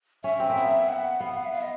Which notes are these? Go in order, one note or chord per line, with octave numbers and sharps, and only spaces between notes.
C#4 E5
C4
A#3
B3 E5
F#5
B3 F5
F#5
F5
E5
F5
D#5